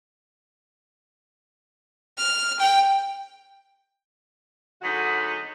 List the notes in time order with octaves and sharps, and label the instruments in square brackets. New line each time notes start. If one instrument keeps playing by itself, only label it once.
[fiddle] F6
G5
[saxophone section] D3 F#3 G#3 B3 D#4 F#4